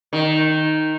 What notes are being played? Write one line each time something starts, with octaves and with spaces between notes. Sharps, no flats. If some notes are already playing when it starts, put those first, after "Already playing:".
D#3